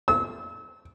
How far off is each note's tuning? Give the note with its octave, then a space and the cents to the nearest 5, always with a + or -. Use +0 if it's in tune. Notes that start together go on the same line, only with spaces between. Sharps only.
E6 -35